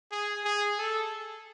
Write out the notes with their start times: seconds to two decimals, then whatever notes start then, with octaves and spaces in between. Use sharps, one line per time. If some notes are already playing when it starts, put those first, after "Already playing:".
0.12 G#4
0.44 G#4
0.79 A4